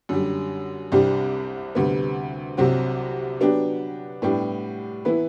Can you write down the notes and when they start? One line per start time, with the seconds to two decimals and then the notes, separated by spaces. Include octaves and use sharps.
0.09 F#2 D3 G3
0.92 C2 C3 G3 D4 G4
1.75 D2 C3 G3 B3
2.57 C2 C3 F#3 C4 F#4
3.40 F#3 B3 D4 G4
4.22 A2 G3 B3 D4 G4
5.05 E3 B3 E4 B4